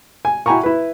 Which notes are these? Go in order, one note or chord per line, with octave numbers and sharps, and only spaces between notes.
G#5
E4 F#4 G5 G#5 A#5 C#6
E4 B4